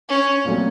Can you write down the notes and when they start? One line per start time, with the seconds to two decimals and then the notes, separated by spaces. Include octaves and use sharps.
0.09 C#4
0.45 A#2 F#3 A3 C4